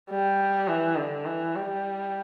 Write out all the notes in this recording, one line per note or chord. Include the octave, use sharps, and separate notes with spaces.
G3
E3
D3
E3
G3